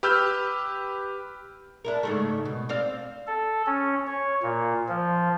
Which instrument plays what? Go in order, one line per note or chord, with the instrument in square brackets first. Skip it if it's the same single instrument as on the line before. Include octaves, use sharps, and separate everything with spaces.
[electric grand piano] G4 B4 E6 F6 G6
[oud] D4 E4 A#4
G#2 C#3 A3
B2
C4 D5 F5
[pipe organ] A4
C#4
C#5
A#2
F3